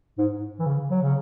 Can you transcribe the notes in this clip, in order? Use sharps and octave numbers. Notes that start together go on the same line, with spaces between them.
G#2
E3
C#3
F#3
C#3